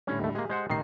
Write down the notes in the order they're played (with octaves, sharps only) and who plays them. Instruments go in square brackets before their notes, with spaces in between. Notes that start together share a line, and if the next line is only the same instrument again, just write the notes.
[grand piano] A2 D3 G3 [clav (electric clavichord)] C#4
[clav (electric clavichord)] D#2 A3
[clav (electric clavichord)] G#3 A#3 [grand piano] G4 G#4
[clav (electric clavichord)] G#3 C5 F#5
[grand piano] A1 C3 C7 [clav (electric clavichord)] D#3 D#4